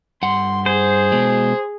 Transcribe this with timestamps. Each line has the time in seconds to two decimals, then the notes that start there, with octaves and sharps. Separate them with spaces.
0.23 G2 F#5 C6
0.66 G#4 C5
1.12 B2 G#3